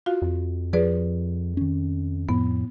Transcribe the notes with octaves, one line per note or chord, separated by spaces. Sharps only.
F4 F#4 F5
F2
F3 G#4 B4 D5
D#3 C#4
F2 A2 F3 B3